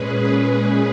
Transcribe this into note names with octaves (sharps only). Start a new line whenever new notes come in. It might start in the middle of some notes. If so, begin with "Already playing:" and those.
Already playing: A#2 G#3 C#4 G#4 B4
G#4 B4